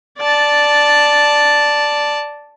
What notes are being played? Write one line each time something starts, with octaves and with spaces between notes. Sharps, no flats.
D5 A5